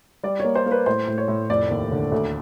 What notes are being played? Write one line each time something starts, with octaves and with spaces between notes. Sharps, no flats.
G3 D5
A#3 C#5
C5
A#3
B4
A2 C5
A2
C#5
A2
F1 D5
D#2
D3
D2